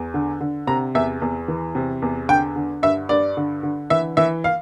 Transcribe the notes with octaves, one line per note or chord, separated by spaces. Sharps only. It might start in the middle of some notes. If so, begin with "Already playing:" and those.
Already playing: E2
D3
D3
C3 A#5
E2 E5
E2
E3
C3
E2
D3 G5
D3
G2 E5
G2 D5
D3
D3
E3 E5
E3 E5
F5